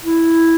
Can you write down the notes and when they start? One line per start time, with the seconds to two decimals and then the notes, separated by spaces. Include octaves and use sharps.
0.04 E4